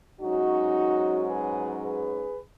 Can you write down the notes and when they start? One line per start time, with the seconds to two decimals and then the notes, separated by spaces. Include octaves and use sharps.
0.21 G#2 F#3 C#4 D#4 F#4
1.27 G#4 B4
1.81 G#4 B4